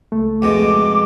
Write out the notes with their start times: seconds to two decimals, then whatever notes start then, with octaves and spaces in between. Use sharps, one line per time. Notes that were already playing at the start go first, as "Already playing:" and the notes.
0.12 C#2 A3
0.42 F2 B2 G#3 D6